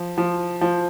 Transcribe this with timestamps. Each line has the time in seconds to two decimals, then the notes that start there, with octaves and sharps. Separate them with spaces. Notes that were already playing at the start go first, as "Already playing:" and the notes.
Already playing: F3
0.18 F3
0.61 F3